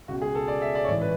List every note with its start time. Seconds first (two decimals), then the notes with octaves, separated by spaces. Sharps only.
0.08 C#2 B2 F#4
0.22 G#4
0.35 A4
0.48 D5
0.62 E5
0.75 D5
0.84 C#5
0.88 A1 G#2 E3 D5
1.01 B4